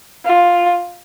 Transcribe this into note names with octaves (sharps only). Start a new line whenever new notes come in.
F4